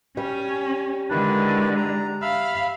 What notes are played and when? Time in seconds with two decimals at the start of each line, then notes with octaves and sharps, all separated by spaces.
0.17 G3 C#4
1.11 D3 D#3 G#3 D4 E4 B4
1.77 A#5
2.22 E5 F5 B5 E6 F6